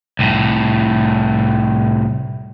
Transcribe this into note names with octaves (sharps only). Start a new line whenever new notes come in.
C2 A2